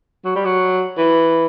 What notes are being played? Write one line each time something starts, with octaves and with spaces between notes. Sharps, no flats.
F#3
G3
F#3
E3